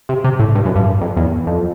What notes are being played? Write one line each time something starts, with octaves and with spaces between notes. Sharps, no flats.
C3
C3
A2
G2
F#2
G2
F2
E2
F2